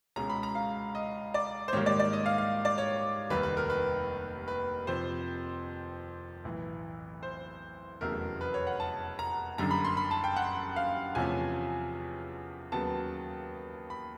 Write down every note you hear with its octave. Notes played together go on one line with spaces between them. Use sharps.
C#2 B2 G#3 C#4 A#5
B5
A#5
F5
D#5
D5
C5
G#2 D#3 G3 A#3 C#5
D5
D5
D#5
F5
F5
D5
C#5
F1 D#2 D#3 G3 B4
B4
A#4
B4
B4
F2 C3 F3 C5
B1 A2 E3
C5
F1 E2 C#3 F#3 A3 A#4
B4
C#5
F#5
A5
A#5
F#1 F#2 D3 G3 A#5
B5
C6
B5
A5
G5
F#5
F5
E2 C3 F3 A3 C#4 G#5
D#2 C#3 F#3 B3 A5
B5